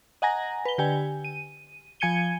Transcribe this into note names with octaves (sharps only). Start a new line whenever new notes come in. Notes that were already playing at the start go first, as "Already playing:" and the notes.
D#5 F#5 G#5 A#5 A#6
B4 G7
D3 G4 G#5
D#7
F3 G#5 G#6 C#7 D#7 G7